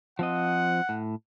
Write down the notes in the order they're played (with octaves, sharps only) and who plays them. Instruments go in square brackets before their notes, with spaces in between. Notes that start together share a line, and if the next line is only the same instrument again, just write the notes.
[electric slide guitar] F3 C4 D#5 [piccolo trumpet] F#5
[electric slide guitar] A2